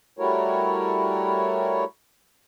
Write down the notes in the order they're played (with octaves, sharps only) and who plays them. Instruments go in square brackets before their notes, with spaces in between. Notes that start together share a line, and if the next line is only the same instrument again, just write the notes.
[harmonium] G3 A3 E4 F#4 A#4 C#5